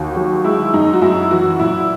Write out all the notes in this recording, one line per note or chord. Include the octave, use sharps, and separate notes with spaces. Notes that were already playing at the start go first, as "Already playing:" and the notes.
Already playing: D#2 F#4
F#3
G#3 E4
F#2 D#4
F#4
F#2 E4
E3 F#4
A#2 E4